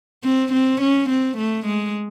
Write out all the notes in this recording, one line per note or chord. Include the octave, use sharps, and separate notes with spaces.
C4
C4
C#4
C4
A3
G#3